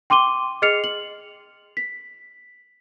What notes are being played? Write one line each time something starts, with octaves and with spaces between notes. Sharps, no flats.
G5 C6 D6 D#7 G7
G#4 D#5 F6 C7 C#7 F7
F#7
B6